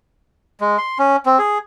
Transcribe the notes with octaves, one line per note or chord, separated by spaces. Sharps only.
G#3
C6
C#4
C4
G#4